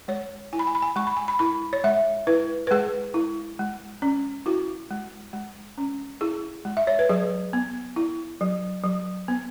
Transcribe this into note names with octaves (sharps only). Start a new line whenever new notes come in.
G#3 C#5
E4 G#5
B5
G#5
B5
G#5
G#3 C#6
B5
G#5
B5
E4 B5
C#5
G#3 E5
E4 B4
B4
G#3 G#4
E4
G#3
C#4
E4 F#4
G#3
G#3
C#4
E4 G#4
G#3
E5
C#5
B4
F#3 G#4
B3
E4
F#3
F#3
B3